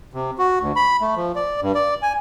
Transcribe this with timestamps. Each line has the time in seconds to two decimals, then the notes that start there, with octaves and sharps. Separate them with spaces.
0.14 C3
0.38 F#4
0.61 D2
0.76 B5
1.01 A3
1.16 F3
1.36 D5
1.61 G2
1.75 D5
2.02 G#5